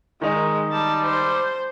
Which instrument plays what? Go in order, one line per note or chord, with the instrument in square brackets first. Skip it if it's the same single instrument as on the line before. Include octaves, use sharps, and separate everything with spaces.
[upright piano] D#3 D#4 [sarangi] G#3
[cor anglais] G3 [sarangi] A5
[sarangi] C5